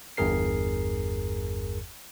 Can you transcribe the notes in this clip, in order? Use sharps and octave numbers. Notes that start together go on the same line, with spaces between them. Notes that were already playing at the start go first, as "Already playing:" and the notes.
G1 E2 G2 G#4 A#4 C7